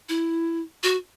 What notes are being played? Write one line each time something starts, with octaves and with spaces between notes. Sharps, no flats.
E4
F#4